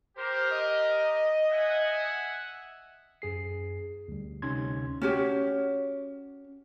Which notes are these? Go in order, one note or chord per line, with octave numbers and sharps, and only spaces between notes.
G4 A#4 C5
D#5
E5 F#5 G#5
F#2 G#4 C7
D2 G3
D2 C3 C#4 D#4 C6 G#6
C#4 F#4 G4 C#5